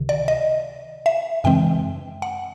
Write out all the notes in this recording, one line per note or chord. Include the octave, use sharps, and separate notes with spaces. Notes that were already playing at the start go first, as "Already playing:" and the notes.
Already playing: C#2 C3 D#3
D5
D#5
E5
F#2 C#3 E3 G#3 C4 G5
F#5